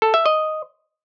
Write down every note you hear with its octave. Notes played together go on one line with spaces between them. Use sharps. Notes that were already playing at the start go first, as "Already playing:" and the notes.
A4
E5
D#5